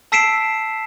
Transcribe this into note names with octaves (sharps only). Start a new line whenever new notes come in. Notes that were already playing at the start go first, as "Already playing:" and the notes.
A5 E6 B6 C7 D7 E7